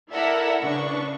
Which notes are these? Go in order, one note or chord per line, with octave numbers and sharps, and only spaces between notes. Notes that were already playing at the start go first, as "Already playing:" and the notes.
E4 A4 A#4 D5 E5 F#5
C#3 D4 B4 C#6